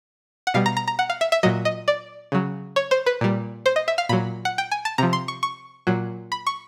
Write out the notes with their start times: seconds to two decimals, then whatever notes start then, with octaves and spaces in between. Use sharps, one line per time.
0.47 F#5
0.54 B2 G3 F5
0.66 A#5
0.77 A#5
0.88 A#5
0.99 F#5
1.10 F5
1.21 E5
1.32 E5
1.43 A#2 F#3 D#5
1.65 D#5
1.88 D5
2.32 C#3 F#3
2.76 C#5
2.91 C5
3.06 B4
3.21 A#2 G3
3.66 C5
3.76 D#5
3.88 E5
3.98 F5
4.09 A#2 F#3 B5
4.45 F#5
4.58 G5
4.71 G#5
4.85 A5
4.98 C3 F3 A#5
5.13 C6
5.28 C#6
5.43 C#6
5.87 A#2 F#3
6.32 B5
6.47 C#6